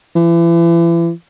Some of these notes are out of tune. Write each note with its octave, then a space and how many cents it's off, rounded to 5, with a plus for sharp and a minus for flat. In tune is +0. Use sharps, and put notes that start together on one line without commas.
E3 +35